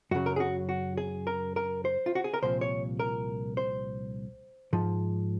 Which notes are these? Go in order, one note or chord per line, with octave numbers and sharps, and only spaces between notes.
F#2 C#3 F#3 F#4
A#4
G#4
F#4
F#4
G#4
A#4
A#4
C5
F4
F#4
G#4
A#4
C2 A#2 F3 C5
C#5
A#4
C5
G#2 F3